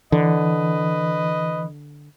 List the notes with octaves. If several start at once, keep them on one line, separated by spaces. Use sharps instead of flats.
D3 E3 B4 D#5